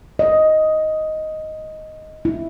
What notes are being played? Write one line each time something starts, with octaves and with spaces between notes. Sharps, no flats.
D#5
E4